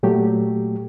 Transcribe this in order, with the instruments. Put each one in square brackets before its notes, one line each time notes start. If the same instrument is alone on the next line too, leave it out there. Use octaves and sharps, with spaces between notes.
[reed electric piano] A#2 F#3 A3 G4